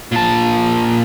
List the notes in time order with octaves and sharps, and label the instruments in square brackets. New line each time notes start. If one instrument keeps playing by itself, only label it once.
[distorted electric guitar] A#2 A5